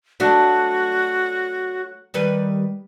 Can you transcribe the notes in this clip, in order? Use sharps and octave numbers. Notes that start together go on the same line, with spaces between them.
F#3 A3 D4 F#4
D#3 G3 B4